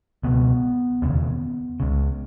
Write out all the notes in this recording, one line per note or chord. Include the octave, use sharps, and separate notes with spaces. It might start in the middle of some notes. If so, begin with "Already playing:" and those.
C#2 B2 B3
E1 D#2 C#3
C#2 C#3